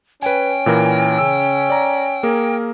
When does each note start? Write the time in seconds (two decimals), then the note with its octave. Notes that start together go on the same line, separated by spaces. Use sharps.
0.22 C#4 B4 G5 G#5
0.66 A#2 E3 A#4
1.18 C#3 E6
1.70 D5 A#5
2.23 A#3 G#4 A#4